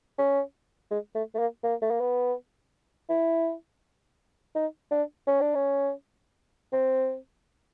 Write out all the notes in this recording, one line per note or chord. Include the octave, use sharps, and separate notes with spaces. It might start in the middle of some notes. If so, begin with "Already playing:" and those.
C#4
G#3
A3
A3
A#3
A#3
A3
A#3
B3
E4
D#4
D4
C#4
D4
C#4
C4